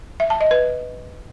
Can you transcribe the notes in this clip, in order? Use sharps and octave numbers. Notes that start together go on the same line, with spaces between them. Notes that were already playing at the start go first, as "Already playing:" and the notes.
E5
A5
D#5
B4